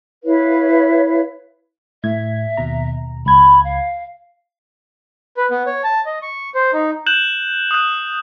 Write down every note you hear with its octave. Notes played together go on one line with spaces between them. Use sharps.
E4 B4 C#5 F5
A2 E5 G#6
D#2 B2 A#5
C#2 B5 G#6
F5
B4
B3
C#5
A5
D#5
C#6
C5
D#4
F#6 G6 E7 F#7
D#6 F#6